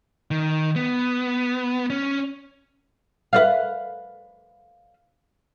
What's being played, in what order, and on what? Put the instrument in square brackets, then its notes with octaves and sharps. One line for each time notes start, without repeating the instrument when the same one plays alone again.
[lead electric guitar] D#3
B3
C#4
[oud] B4 D5 F5